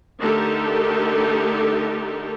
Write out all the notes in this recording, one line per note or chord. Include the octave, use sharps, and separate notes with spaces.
D3 A3 D#4 G4 A4 A#4